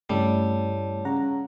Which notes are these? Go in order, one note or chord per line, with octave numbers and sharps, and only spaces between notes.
G2 C#3 G3 A3 E4 C#5 A5
C#3 F#5 A#5